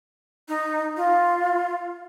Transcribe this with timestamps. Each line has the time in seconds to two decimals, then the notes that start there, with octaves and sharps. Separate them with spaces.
0.48 D#4
0.97 F4